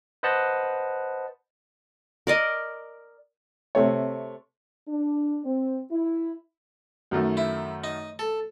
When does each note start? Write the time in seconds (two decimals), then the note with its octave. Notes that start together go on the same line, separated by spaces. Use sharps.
0.23 B4 C5 D#5 F#5 A5 B5
2.27 A#4 D5 D#5
3.75 C3 A3 C#5
4.88 D4
5.45 C4
5.91 E4
7.11 F#2 D#3 A3
7.37 E4
7.84 D#4
8.19 A4